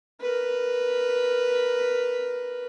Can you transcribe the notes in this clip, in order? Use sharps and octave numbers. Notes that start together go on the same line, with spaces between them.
A#4 B4